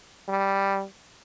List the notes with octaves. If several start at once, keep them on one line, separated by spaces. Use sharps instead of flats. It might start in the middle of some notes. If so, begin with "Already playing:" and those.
G3